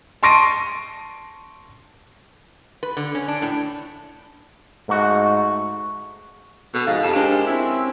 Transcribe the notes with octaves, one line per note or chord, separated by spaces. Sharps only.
A5 C6 C#6 A#6 D7 D#7
B4
D3
C#4
D4
A2
G#2 A3 F#4
B2 A4
G#2 F3 F5
F2 G4 A5
G#3 D4 A#4 C5
C4 C#4 E4